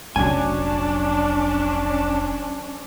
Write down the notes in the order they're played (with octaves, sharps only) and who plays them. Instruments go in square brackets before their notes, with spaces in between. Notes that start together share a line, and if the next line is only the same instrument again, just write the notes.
[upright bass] F1 A#1 [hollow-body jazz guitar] F#3 G#5 [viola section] C#4 D4